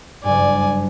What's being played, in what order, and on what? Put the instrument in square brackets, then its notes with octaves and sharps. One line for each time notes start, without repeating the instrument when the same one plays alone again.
[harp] F#1 G2 [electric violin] D5 G#5